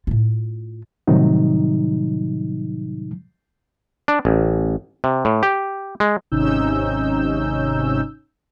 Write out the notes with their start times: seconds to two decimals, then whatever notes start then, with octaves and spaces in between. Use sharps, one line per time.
0.07 A2 F4
1.07 A2 C3 D#3 F#3 G3 D#4
4.08 D4
4.25 A1
5.04 C3
5.25 A2
5.43 G4
6.00 G#3
6.31 G#1 C3 C#4 D#4 E6 G6